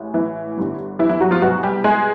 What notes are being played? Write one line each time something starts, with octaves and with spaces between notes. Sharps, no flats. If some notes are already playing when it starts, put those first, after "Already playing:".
Already playing: A1 A2 G#3
E3 E4
G1 G2 D3
E3 E4
E3 E4
F#3 F#4
F3 F4
C2 B2 F#3 G#3 B3 F#4
G3 G4
G#3 G#4